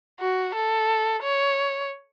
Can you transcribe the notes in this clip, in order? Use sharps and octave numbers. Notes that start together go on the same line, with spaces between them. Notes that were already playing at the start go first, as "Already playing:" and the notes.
F#4
A4
C#5